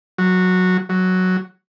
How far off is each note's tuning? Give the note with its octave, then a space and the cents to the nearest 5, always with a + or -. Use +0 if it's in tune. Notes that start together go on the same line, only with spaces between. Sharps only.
F#3 -10
F#3 +0